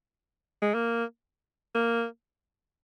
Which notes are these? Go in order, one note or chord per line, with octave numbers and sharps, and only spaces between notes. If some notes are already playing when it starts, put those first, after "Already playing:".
G#3
A#3
A#3